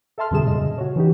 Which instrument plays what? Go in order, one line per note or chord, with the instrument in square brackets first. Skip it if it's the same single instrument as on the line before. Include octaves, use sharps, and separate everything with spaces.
[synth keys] A4 E5 A5 C6 F6
F2 B2 D3 G3 G#4 E7
F#2 A#2 C#3 D#5
F#4 C#5
E3 C#4 D#4 F#4 G4